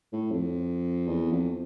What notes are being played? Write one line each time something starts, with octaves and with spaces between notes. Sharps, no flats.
A2
F2
E2
F2